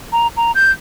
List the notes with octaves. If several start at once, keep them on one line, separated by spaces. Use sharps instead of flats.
A#5
A#5
G6